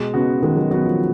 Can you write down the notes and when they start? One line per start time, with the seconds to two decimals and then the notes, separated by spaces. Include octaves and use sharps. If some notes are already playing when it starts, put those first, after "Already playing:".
Already playing: B2 G#3
0.14 C#3 B3 F#4
0.42 D#3 G#3
0.57 F#3
0.71 F#3 B3 F#4
0.85 F3